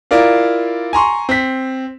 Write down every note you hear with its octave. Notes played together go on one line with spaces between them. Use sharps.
E4 F4 A#4 D5 F5
G#5 A#5 C6 C#6
C4 B6